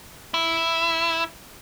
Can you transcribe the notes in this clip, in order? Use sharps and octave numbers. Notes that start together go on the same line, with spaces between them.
E4